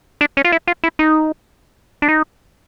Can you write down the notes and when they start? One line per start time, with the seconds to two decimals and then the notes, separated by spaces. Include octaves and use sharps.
0.21 D4
0.37 C#4
0.45 F4
0.52 E4
0.67 F4
0.84 E4
0.99 D#4
2.02 D4
2.09 D#4